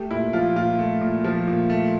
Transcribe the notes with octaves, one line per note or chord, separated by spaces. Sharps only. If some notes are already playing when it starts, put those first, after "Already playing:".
Already playing: A3 G4
A#2 E4
F3 F4
A#2 F4
A3
A#2
F3
A#2
A3